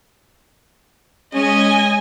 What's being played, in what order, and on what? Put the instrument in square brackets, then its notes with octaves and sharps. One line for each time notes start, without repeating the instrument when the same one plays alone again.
[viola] G#3 [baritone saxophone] C#4 [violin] D#5 G#5